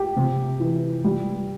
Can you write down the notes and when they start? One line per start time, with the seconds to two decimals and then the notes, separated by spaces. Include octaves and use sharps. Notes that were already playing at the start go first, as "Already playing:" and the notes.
Already playing: G4
0.16 C3
0.60 E3
1.04 G3